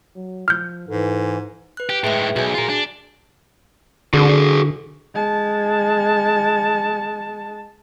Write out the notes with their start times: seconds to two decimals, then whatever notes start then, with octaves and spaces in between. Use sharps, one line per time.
0.16 F#3
0.48 F3 F6 G6
0.88 G#2 E3 A4
1.77 B4 F#6
1.89 G4 G5
2.04 A2 G#3 G#4 B4 E5
2.36 B1 F#4 G#4 G#5
2.54 F4 A#4
2.69 D4
4.14 D3 F#4 G#4
5.15 G#3 A5